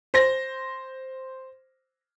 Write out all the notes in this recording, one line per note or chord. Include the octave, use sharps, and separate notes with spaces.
C5 A#6